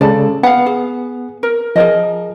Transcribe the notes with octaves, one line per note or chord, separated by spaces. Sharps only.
C#3 G#3 A4 D5 A5
B3 F5 F#5
G#4
A#4
F3 G#4 A#4 D#5